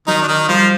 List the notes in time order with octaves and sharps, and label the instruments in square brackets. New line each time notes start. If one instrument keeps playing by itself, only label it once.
[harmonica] D#3 D#4 [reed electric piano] F#3
[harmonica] D4
D#3 D#4
[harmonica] F3 F4 [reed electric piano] G3